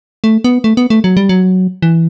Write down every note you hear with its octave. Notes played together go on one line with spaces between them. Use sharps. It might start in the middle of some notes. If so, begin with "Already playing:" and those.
A3
B3
A3
B3
A3
F#3
G3
F#3
E3